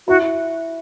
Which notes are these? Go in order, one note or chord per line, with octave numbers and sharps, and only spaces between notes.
E4 F#4